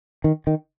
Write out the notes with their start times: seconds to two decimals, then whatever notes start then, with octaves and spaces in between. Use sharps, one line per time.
0.24 D#3
0.47 D#3